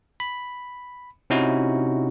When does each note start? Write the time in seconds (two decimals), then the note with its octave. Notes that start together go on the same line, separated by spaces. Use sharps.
0.20 B5
1.30 C3 C#4 D#4 E4 F#4